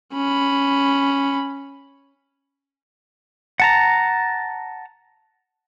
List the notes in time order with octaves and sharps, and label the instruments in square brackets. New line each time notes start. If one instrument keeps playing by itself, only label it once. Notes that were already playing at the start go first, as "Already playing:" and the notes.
[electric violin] C#4 B5
[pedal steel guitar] F#5 A5 A#5